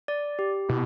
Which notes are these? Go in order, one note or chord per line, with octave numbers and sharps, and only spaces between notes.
D5
G4
B2 E4